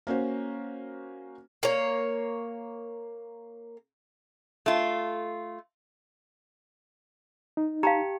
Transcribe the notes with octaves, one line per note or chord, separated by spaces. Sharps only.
A#3 C#4 F#4 C5
A#3 C#5
A3 F4
D#4
G4 F5 A5 A#5